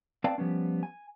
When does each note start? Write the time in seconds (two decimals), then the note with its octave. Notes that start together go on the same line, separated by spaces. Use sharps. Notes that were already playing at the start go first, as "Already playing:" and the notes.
0.24 C4 B4 D5 F5 G5 A5
0.38 F3 G3 B3 C#4
0.83 G#5